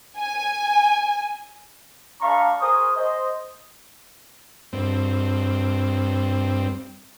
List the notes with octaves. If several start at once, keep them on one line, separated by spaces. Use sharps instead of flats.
G#5
A3 D4 F5 A#5 B5 C#6
G#4 A#4 C5 C#6 D#6
C5 D#5
G2 C4